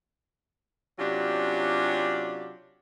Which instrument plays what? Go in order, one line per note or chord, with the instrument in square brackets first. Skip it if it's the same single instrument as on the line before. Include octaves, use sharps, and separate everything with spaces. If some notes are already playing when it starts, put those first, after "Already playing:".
[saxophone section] C3 F#3 C#4 D4 F4 G4